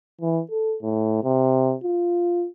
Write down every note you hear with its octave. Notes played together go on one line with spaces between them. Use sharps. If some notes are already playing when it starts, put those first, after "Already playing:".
E3
A4
A2
C3
F4